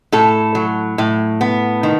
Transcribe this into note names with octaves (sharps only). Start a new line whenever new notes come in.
A2 A4
F#3
A2
B3
D#3